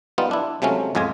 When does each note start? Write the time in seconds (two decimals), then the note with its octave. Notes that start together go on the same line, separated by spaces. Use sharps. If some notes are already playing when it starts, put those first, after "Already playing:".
0.18 G3 B3 D#4 F4
0.31 D4 E4
0.62 C3 F3 F#3 G#3 A3 C#4
0.95 A1 F2 G#3 F4 G#5